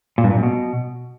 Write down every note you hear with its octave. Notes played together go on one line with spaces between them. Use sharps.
A#2
G2
A#2
F#2
B2